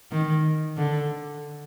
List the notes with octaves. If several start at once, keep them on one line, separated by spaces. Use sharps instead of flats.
D#3
D3